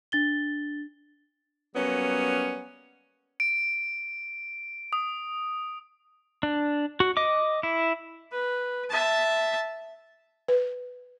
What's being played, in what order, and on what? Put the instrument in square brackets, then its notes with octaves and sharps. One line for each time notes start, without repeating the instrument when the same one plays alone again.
[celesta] D4 A6 G7
[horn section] F#3 G3 A#3 B3 C#4
[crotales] D7
D#6
[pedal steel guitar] D4
F#4
D#5 D6
E4
[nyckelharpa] B4
E5 A5
[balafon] B4